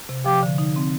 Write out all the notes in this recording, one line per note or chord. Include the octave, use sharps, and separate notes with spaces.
C3
F3 G4
D3
D#4
C4